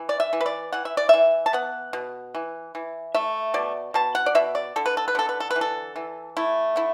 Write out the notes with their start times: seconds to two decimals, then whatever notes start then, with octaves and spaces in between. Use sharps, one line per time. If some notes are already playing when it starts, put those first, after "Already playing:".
Already playing: E3
0.09 D5
0.20 E5
0.33 E3
0.41 B4
0.46 D5
0.73 E3 F#5
0.85 E5
0.97 D5
1.09 E3 E5
1.46 A5
1.53 B3 F#5
1.93 B2
2.35 E3
2.75 E3
3.15 A3 E5
3.54 B2 D5
3.94 B2 A5
4.15 F#5
4.26 D5
4.35 B2 E5
4.55 D5
4.76 D3 A4
4.86 B4
4.97 A4
5.08 B4
5.15 D3 A4
5.29 B4
5.40 A4
5.51 B4
5.56 E3
5.61 A4
5.96 E3
6.37 A3 E4
6.76 D3 E4